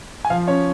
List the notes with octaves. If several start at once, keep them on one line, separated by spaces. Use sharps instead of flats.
G#5
F3 F5
C#4 C#5